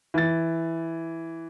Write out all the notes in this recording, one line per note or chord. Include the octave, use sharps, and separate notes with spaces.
E3 A6